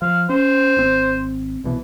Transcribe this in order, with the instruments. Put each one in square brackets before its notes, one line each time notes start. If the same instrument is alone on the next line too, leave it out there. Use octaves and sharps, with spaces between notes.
[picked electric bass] F3 [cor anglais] F5
[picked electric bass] C#4 [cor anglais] C5
[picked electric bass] G#1 C4
C2 B2 E3